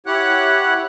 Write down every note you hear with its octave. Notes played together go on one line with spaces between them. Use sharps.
E4 G4 C#5 F#5 F#6